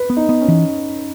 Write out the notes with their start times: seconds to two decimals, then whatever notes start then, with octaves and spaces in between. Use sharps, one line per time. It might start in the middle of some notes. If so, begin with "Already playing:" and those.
Already playing: B4
0.10 B3
0.17 D#4
0.29 B3
0.41 C#4
0.48 E3